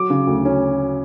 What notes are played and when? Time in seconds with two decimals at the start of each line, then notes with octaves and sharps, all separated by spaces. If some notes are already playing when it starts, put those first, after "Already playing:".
Already playing: F#3 D6
0.10 C#3
0.27 D2
0.45 C#4